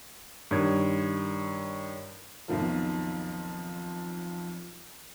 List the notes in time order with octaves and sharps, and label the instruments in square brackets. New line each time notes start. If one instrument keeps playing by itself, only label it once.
[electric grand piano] G2 D#3 C#5 G#6
[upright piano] B1 F2 D#3 F3